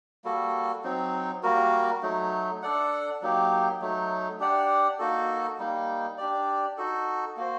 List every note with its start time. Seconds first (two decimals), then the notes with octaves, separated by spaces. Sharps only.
0.24 G3 A#3 F#4 A4
0.84 F#3 C4 D#4
1.43 G3 A#3 F#4 A#4
2.02 F#3 A3 D#4
2.62 D4 A4 D5 F#5
3.22 F#3 A#3 D#4 G4
3.81 F#3 A3 D#4
4.40 D4 G4 D5 F#5
4.99 A#3 D#4 F#4 A4
5.59 G3 A#3 D#4
6.18 D4 G4 D5
6.78 D#4 F#4 A4
7.37 A#3 F#4 C5